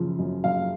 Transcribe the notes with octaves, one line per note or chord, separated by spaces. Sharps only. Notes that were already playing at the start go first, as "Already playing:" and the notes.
Already playing: F#2 C#3 F3
F#2
F#2 F5